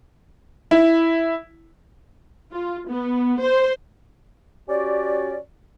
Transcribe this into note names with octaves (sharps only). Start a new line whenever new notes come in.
E4
F4
B3
C5
C#4 F#4 G4 D5